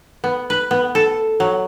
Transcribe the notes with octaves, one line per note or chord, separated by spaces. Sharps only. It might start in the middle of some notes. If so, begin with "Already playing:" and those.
B3
B4
B3
A4
F#3